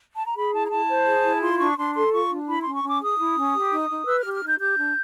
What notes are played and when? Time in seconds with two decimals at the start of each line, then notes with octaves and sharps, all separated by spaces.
0.15 A5
0.26 A#5
0.36 G#4 B5
0.54 E4 A5
0.65 A#5
0.71 E4 A5
0.88 C5
1.07 G#4
1.24 E4
1.41 F4 C6
1.59 D4 C#6
1.77 D4 C6
1.94 A4 C6
2.12 F4 C#6
2.30 D4
2.48 E4 B5
2.61 C#4 C6
2.75 C#6
2.83 C#4 D6
3.01 G#4 D#6
3.19 E4
3.36 C#4
3.54 G4
3.71 D#4
3.89 D#4
4.06 B4 E6
4.20 F6
4.24 G4
4.33 F6
4.42 D#4
4.47 G6
4.60 G4 G6
4.77 D4